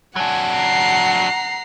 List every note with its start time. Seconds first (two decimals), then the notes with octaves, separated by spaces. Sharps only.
0.16 F#3 D4 F#5 G#5
0.53 A#5 C7